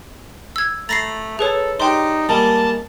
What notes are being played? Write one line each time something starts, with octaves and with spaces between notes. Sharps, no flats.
E6 G#6
A3 A#5 B5 A6 A#6 C7
G#4 A4 B4 C#5
D4 D#4 G4 G5 C6
G3 G#3 A#3 A5